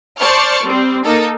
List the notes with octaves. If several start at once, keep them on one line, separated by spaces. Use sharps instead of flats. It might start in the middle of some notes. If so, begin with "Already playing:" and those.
C5 D5 A5 C#6 F6
G3 C4
A#3 D#4 A4